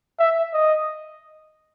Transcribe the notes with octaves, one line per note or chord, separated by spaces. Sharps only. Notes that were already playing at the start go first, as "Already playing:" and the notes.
E5
D#5